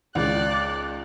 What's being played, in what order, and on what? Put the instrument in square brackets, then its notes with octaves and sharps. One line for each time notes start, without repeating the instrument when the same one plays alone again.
[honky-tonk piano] C#2 D#3 [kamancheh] D5 F#6